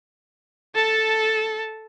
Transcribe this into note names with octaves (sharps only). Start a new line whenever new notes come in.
A4 A5